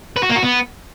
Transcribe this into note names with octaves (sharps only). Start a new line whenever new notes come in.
B4
F#4
A#3
F#4
B3